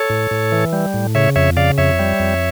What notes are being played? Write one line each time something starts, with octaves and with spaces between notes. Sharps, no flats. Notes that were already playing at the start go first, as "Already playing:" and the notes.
Already playing: A4 C#5
A2
A2
E3
G3
A2
C#3 C#5 E5
F2 C#5 E5
C#3 D5 F5
F2 C#5 E5
G3
F2